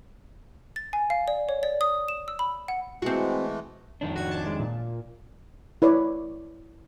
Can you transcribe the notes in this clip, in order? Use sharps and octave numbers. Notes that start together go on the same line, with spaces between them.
A6
G#5
F5
D5
C#5
D5
D#6
E7
E6
B5
F#5
E3 G#3 A3 C4 F#4
F2 D#3 D4
F#4 G#6
A5 D6
G#3
A#2
E4 B4 C#5 D5